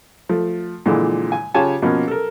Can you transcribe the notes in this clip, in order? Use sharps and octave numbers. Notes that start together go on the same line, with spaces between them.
F3 A3
A#2 D3 E3 F3 G#3
G#5
C#3 F4 G4 C#5 G#5 A5
B2 F3 A#3 C#4
A4 A#4